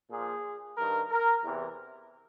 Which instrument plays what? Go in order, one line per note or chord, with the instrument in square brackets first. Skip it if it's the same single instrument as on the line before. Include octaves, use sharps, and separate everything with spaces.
[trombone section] A#2 F3 G#4
G2 D#3 A#4
A#4
E2 C3 E3